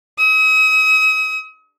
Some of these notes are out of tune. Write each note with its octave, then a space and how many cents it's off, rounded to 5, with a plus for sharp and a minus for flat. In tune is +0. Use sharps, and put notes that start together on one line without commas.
D#6 +40